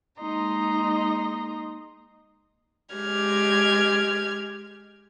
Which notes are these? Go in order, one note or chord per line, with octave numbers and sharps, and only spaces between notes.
G#3 A#3 D#4 D#5 A#5 C6
G#3 G4 F6 G#6